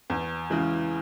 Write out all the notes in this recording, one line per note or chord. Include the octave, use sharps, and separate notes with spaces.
E2
C#3 E3 G#3